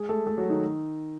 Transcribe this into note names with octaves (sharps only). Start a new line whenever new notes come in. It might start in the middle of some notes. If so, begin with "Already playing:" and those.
Already playing: G#3 G#4
A3 A4
A3 A4
F#3 F#4
D#3 D#4